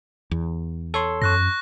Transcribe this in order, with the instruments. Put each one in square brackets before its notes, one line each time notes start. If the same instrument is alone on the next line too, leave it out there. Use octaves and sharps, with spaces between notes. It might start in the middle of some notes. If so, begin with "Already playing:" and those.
[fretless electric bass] E2
[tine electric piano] A4 C#5 C6
[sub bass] F#2 [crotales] C#6 F#6 A#6